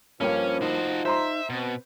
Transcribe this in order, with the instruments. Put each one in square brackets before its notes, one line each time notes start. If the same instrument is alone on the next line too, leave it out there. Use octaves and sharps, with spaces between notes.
[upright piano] G2 A#3 [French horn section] F3 [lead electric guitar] C#4 [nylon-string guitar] C#5 G5
[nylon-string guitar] D#4 [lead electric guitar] F#4 C5
[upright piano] C5 A#5 C6 [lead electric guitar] E5
[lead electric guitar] B2 [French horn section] C4 B4